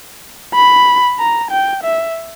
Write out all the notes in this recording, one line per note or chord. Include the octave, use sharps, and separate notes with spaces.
B5
A#5
G5
E5